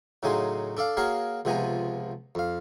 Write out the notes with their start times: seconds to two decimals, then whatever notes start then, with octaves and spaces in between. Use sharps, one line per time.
0.23 A2 C#3 F#3 D#4 G#5 C6
0.77 D4 A4 D5 F5
0.97 A#3 F#4 G#4 A#4 C#5 F5
1.45 C#2 C3 F3 B3 G#5 A#5
2.35 F2 F5